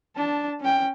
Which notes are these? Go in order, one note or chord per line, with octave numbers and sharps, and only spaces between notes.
D4 A5
C#4 G5